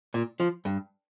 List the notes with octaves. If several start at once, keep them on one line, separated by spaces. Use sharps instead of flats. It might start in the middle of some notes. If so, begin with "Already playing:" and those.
A#2
F3
G2